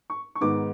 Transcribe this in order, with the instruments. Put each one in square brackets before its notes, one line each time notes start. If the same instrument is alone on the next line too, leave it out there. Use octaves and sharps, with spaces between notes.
[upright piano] C#6
C#6
G#2 D#3 G#3 B3 D6